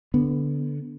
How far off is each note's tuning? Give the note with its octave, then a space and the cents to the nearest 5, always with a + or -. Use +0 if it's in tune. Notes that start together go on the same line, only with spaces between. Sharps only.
D3 -10 B3 +0